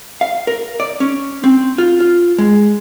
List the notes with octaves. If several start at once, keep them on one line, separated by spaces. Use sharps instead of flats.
F5
A#4
D5
C#4
C4
F4
F4
G#3